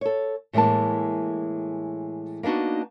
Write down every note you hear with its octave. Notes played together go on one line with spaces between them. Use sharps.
A4 C#5
A2 E3 G#3 A#3 A5
A#3 B3 D4 D#4 F#4